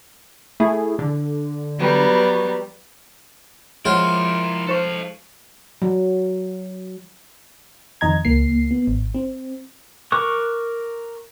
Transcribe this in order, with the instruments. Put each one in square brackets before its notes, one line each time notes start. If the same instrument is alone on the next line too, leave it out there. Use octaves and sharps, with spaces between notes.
[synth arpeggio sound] A3 E4 G#4
D3
[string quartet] F#3 G3 B3
[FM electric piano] F3 G#3 [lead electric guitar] E4 A#4 [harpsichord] F4 [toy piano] C#5 F#5
[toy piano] D#4 C5 C#6 [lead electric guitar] A4 F5
[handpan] F#3
[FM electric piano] F2 D#3 D#5 A#5 G#6
C#2 A#3 C7
B3
G#1
C4
[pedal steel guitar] A#4 C#6 D6 F#6